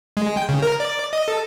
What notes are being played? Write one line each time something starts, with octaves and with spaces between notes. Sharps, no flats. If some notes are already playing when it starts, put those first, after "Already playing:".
G#3
G5
C#3
A#4
D5
D#5
A4